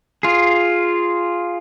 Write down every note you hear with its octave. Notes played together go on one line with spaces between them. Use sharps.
F4 G#4